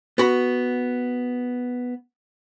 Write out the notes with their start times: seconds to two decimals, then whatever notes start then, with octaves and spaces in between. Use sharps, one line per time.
0.18 B3 F#4 B5